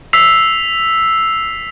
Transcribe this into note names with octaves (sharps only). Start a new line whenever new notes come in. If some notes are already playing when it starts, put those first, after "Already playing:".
E6 B6 C7 F7